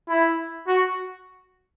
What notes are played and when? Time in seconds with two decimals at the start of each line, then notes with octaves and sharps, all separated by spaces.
0.09 E4
0.68 F#4